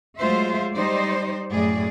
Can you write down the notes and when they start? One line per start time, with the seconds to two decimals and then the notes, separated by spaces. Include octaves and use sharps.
0.17 F#3 G#3 A3 F4 C5 E5
0.74 G3 D#4 C5 D5
1.52 F#2 A2 G#4 D5